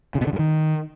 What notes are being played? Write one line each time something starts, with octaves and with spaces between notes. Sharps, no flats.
C#3
B2
D3
G2
D#3